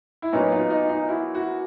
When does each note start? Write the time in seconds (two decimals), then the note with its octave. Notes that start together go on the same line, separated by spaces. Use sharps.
0.22 E4
0.32 A#2 F#3 B3 C#4 D#4
0.52 D#4 F4
0.70 D#4 F4
0.89 D#4 F4
1.08 E4 F#4
1.34 E4 F#4